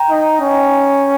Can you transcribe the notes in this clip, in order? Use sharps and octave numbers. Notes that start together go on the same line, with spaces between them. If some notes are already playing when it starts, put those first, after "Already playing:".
Already playing: G5 A#5
D#4
C#4